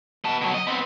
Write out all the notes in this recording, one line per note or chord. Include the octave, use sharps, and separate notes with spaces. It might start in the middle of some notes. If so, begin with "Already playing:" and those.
B3 A5
B2 F#3
D#5
B3 C4